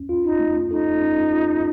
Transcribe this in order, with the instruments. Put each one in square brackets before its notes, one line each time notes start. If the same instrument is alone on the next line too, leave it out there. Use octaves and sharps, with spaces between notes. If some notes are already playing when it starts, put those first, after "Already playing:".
Already playing: [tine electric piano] C#4
F4
[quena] D#4
[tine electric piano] A3
[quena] D#4 [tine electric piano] A4
[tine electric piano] C#4
F4